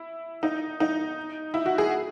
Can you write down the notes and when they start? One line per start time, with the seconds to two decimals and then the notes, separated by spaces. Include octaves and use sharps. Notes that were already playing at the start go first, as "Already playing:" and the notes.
Already playing: E4
0.43 D#4
0.80 D#4
1.54 E4
1.66 F#4
1.78 G#4